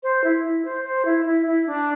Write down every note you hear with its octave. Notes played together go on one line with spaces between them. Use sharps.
C5
E4
E4
C5
C5
E4
E4
E4
D4